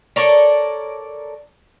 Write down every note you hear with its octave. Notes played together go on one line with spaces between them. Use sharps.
A4 A#4 C#5 D5